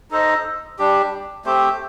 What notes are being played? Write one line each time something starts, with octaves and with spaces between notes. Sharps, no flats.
D#4 A4 C5 D#5
G3 D4 G4
A3 C4 G4 C5